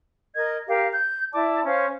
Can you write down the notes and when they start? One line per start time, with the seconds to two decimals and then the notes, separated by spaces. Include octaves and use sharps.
0.34 A#4 D#5 G#6
0.68 G4 A#4 F5
0.93 G6
1.33 E4 D5 A5 D6
1.65 C#4 C5 F5